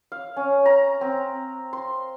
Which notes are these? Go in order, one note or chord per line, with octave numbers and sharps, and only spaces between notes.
F5
C#4
A#5
C4
C6